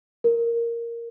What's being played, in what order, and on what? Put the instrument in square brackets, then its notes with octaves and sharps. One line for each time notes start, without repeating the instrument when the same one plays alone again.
[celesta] A#4